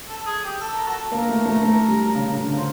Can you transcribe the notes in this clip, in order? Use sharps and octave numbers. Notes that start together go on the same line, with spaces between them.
A4
G#4
G4
A4
A#4
F#4 A4
A#3 A#4
A3
A3
A3
G3
C#3
C#3
D3
C#3
C5